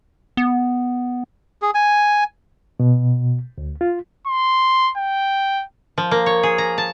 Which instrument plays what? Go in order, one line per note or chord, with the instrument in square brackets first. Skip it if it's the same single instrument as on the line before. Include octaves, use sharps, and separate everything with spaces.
[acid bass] B3
[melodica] G#4
G#5
[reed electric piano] B2
D2
F4
[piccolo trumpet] C6
G5
[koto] F3
A#3
C#5
G#4
A#5
A5